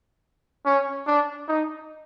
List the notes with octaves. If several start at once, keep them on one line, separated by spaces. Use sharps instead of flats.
C#4
D4
D#4